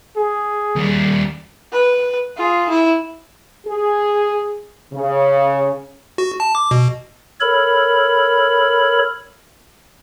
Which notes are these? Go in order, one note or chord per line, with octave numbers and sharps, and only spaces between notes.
G#4
D#2 G3
B4
F4 G#4
E4
G#4
C#3
F#4
A5
D6
B2
A4 A#4 C#5 B5